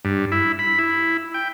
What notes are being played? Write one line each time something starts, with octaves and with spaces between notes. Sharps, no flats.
G2
E4
B5
E4
G5